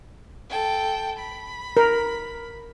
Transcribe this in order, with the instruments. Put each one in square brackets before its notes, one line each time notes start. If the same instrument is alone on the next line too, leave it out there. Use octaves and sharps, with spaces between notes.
[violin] A4 G5
B5
[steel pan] A#4